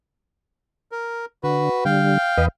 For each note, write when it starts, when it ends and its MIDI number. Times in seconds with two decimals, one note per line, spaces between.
0.92 1.25 70
1.43 1.69 50
1.43 1.84 66
1.43 1.84 71
1.85 2.18 50
1.85 2.18 55
1.85 2.46 77
1.85 2.46 79
2.38 2.48 40
2.38 2.48 71
2.38 2.48 75